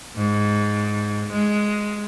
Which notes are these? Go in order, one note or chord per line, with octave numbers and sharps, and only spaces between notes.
G#2
G#3